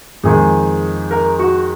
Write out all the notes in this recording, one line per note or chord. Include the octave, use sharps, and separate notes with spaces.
F2 D#3 G#3 G#4
A#4
F#4